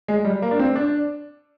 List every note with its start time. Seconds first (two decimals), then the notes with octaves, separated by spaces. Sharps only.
0.08 G#3
0.25 G3
0.42 A#3
0.51 D4
0.59 C4
0.76 D4